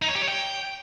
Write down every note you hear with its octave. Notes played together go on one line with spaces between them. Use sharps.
D#4
C#5
G4
C#5
G5